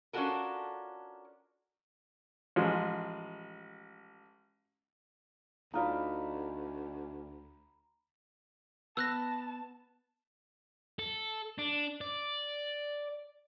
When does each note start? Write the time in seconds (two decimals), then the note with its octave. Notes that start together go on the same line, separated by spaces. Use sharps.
0.13 C#4 D4 F4 F#4 A4 A#4
2.56 A1 F3 G#3
5.74 D2 D#4 F4 D5 A#5 B5
8.97 B3 A5 E6 F#6 A#6
10.99 A4
11.59 D4
12.01 D5